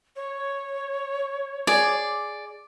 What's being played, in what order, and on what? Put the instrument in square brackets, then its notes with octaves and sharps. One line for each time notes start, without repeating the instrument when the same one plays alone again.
[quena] C#5
[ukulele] G#4 [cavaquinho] D5